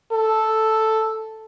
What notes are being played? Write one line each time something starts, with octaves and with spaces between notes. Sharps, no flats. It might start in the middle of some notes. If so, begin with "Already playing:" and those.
A4